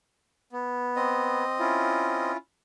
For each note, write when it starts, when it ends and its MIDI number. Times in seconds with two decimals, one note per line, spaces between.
0.53 1.44 59
0.96 2.32 60
0.96 2.32 75
1.59 2.37 61
1.59 2.37 64
1.59 2.37 65